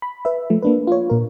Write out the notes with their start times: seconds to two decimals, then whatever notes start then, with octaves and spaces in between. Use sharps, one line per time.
0.02 B5
0.25 B4 E5
0.50 F3 A3
0.62 A#3 D4 B4
0.87 F4 C#5
1.10 A#2 A#4